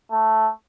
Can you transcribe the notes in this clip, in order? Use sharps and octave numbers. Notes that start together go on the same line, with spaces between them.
A3